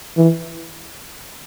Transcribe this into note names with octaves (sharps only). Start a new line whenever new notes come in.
E3